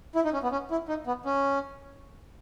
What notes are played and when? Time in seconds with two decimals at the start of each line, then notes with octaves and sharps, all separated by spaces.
0.15 E4
0.25 D#4
0.33 C#4
0.43 B3
0.52 C#4
0.71 E4
0.88 D#4
1.07 B3
1.25 C#4